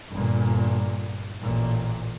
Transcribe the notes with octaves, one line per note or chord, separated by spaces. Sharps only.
G1 A#2
A1 A#2